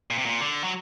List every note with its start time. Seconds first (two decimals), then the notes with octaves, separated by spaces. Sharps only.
0.11 A#2
0.18 C3
0.26 A#2
0.41 D3
0.64 F#3